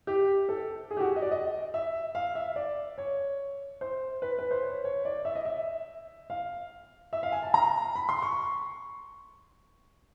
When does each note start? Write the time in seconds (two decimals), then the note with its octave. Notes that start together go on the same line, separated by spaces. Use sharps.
0.07 G4
0.49 A4
0.91 G#4
0.97 G4
1.00 F#4
1.16 D#5
1.22 D5
1.31 D#5
1.74 E5
2.15 F5
2.35 E5
2.56 D5
2.98 C#5
3.81 C5
4.22 B4
4.38 B4
4.51 C5
4.63 C#5
4.84 C#5
5.05 D5
5.25 E5
5.35 D#5
5.45 E5
6.30 F5
7.13 E5
7.23 F5
7.32 G#5
7.43 A5
7.54 A#5
7.96 B5
8.09 C6
8.22 C#6